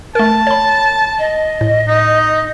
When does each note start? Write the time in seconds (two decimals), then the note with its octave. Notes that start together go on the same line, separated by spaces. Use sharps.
0.15 A3 A#4 A5
0.47 C#5 B5
1.18 D#5
1.61 A2
1.88 D#4